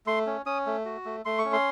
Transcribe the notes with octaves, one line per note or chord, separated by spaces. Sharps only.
A3 C6
C#4
C#4 D#6
A3
F#4
A3
A3 C6
C#6
C#4
C6